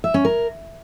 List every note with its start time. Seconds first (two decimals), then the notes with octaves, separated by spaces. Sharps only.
0.04 E5
0.14 C#4
0.25 A#4